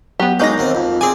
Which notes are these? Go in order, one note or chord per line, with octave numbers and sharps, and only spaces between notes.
F#3 B3 G4
F#3 G#3 A#3 D#4 G6 A#6
D#2 C4
F2
C4 G#4 D5 G#5